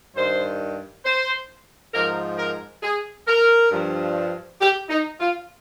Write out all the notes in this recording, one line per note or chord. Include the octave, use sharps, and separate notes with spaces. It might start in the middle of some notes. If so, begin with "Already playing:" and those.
G2 D#3 C5
C5
G#2 F3 A#4
A#4
G#4
A#4
G2 F3
G4
D#4
F4